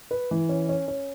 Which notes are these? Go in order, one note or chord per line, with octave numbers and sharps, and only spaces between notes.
B4
E3
C#4
C#4
C#4